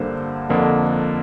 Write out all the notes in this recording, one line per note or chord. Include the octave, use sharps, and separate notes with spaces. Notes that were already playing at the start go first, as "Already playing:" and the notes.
Already playing: G2 D3 G3 A#3 C5
F2 D3 F3 A#3